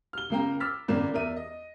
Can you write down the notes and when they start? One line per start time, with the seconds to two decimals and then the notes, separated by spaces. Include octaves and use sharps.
0.13 F6 G7
0.30 C#2 C#3 A#3 F5 G5 A#5
0.60 D6 E6 F6 A6 B6
0.88 G#1 A2 C#3 A#3 D5 E7
1.13 E2 A#4 D5 E5 D#7
1.36 D#5